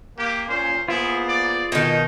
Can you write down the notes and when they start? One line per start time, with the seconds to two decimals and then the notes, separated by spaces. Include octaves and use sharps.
0.18 A#3 G4
0.49 A#2 C#4 C5
0.88 A#3 B3 E4 F4 G#4 C5
1.28 D5
1.72 B2 D#3 D#4